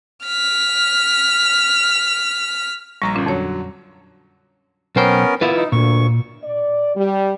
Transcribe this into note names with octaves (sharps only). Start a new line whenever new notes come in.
F6 B6
A#1 G3 A#5 C#6 A#6
G1 A#2 C#4 F4
F2 D3 F#3 C#5
B1 B3 C#4 A#4 C5 G5
A#2 B3 E4 F4 B4
D#4
D2 A#2 C#6
D5
G3